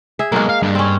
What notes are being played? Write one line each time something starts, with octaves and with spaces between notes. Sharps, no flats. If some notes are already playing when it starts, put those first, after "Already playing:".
G#4 E5
B1 G#3 A#3
F5
G2
C4 C#4